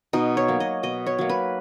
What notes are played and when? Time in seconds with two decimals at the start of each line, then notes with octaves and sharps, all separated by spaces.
0.13 B2 D#4
0.37 C#5
0.48 F#3 A#3
0.60 D#5
0.83 B2 D#5
1.06 C#5
1.18 F#3 A#3
1.29 B4